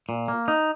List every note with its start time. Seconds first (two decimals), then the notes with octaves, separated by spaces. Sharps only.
0.09 A#2
0.28 A#3
0.48 D#4